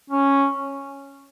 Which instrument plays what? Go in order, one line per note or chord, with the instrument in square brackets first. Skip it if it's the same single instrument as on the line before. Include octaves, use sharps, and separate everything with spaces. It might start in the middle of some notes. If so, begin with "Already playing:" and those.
[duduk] C#4